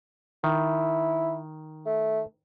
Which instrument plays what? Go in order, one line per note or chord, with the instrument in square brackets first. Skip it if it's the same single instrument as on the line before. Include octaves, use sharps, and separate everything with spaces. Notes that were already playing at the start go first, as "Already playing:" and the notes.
[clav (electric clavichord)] D#3 [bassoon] E4
[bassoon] A3